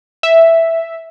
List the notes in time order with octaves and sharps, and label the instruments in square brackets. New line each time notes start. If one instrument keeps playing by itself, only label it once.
[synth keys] E5